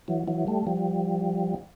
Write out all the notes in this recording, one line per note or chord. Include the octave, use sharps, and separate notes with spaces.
E3 F#3
E3 F#3
G3 A3
F3 G3